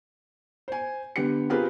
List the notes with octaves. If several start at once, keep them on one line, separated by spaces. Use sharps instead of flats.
C5 G#5
D3 B3 G4 C#7
C4 F4 G4 G#4 A#4 B4